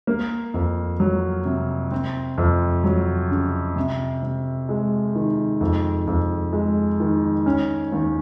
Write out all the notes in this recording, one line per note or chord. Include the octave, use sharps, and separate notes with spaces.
A#3
F2
F#3
C3
C4
F2
F#3
C#3
C3
C3
G#3
D#3
F2
F2
G#3
D#3
C#4
D#2